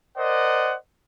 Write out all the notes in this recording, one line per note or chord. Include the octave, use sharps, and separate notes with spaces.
A#4 C5 D5 D#5 F#5